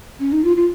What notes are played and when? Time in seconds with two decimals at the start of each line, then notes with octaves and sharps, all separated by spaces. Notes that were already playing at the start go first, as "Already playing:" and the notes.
0.20 C#4
0.32 D#4
0.44 F4
0.57 F4